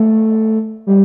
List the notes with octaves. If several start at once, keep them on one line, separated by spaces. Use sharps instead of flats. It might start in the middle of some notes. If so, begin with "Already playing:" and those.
Already playing: A3
G3